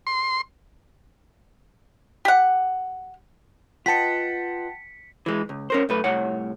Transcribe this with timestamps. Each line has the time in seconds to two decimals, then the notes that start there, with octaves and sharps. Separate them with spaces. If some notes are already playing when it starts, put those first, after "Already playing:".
0.07 C6
2.25 G4 F#5
3.86 F4 B4 D#5 F#5 G5 A5 B6 C#7
5.26 E3 G#3
5.49 C#2
5.70 C#4 A#4 C5
5.89 B1 A3 B4
6.04 C2 A2 C#5 F#5